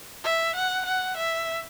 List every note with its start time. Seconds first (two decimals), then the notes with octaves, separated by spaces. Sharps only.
0.24 E5
0.56 F#5
0.86 F#5
1.17 E5